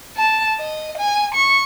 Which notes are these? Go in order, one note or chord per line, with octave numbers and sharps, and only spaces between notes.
A5
D#5
G#5
C#6